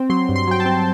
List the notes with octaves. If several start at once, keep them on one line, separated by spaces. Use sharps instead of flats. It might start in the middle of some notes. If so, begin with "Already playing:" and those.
Already playing: C4
F#3 C6
G2
C6
F#3 G5
A5
C4